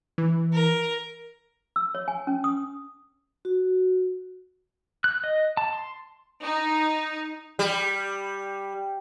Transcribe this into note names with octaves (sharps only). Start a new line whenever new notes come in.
E3
A#4
E6
C#5
G#5
C#4
D#6
F#4
F#6
D#5
A5
C6
D#4
G3